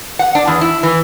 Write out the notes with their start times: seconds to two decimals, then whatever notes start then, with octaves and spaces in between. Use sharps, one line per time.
0.19 F#5
0.35 D4
0.47 E2
0.61 E4
0.83 E3